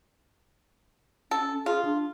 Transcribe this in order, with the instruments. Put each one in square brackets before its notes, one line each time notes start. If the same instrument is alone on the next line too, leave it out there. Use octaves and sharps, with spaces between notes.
[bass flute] C#4 [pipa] A4
[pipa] F4 [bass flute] G#4
[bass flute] D4